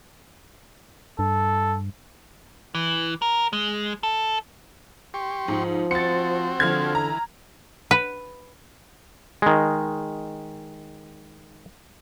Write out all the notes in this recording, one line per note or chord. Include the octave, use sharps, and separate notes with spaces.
G2 A4
E3
A#4
G#3
A4
G4 C6 C#6
G#2 F3
C4 F#4 C5 A6 C#7
D3 F3 F6 G#6
E3 A#5
B4
D#3 G#3